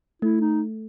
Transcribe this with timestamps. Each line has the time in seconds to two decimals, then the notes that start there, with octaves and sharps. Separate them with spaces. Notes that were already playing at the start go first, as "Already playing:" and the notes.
0.22 A3 E4
0.41 D#4